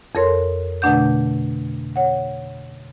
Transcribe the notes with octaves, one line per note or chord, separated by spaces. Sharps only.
F2 A4 A#4 C#5 C6
B2 D3 A3 D4 F#5 G6
C#5 F#5